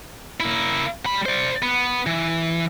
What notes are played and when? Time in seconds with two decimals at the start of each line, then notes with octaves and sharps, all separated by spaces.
0.40 A#3 E4
1.05 G3 B5
1.26 C5 D5
1.62 B3
2.06 E3